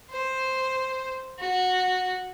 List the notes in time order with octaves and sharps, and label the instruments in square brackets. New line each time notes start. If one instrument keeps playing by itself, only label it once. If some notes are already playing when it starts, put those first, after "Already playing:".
[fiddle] C5
F#4